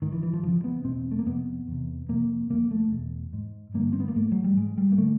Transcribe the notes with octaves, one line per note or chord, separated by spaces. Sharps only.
G#2 D#3
E3
E3
F3
F2 C#3 F3
B3
E2 B2 C4
A3
A#3
F2 C3 B3
E2 C3
F2 C3 A#3
F2 C#3 A#3
A3
E2 B2
G#2
G2 D3 A#3
C4
B3
A#3
G#2 A3
F#3
G3
G#2 G#3
G3
A#3
D3 A3